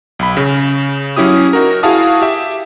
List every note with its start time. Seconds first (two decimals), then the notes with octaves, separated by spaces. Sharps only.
0.19 B1 B5
0.37 C#3
1.16 F#3 C#4 E4 G4 D#6
1.53 D#4 F#4 A#4
1.83 E4 F#4 G#4 F5 A5 D#6
2.22 G4 E5